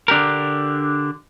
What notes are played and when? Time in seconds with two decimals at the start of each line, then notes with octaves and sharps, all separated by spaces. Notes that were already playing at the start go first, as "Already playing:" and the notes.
0.08 D3 D4 G4 A#4